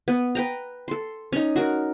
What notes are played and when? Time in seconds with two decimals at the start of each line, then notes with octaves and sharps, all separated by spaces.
0.08 B3
0.35 B4 G5 A#5
0.88 A4 C6
1.32 C#4 D#4
1.56 F#4 A#4